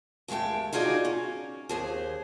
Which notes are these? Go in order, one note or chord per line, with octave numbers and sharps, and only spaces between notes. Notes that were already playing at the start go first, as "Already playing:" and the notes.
D#2 A2 G#3 A3 G5
D#4 F4 F#4 G#4 D5
C#4
D#2 G#4 C5